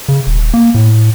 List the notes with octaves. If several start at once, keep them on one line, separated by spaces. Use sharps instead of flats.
C#3
D#1
A#3
A2